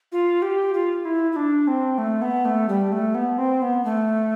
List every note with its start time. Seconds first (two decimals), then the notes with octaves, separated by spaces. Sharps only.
0.12 F4
0.42 G4
0.74 F4
1.05 E4
1.32 E4
1.36 D4
1.68 C4
1.98 A3
2.22 B3
2.45 A3
2.69 G3
2.92 A3
3.15 B3
3.38 C4
3.62 B3
3.85 A3